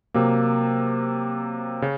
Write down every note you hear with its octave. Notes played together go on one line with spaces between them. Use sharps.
C3 F#3 A#3
C#3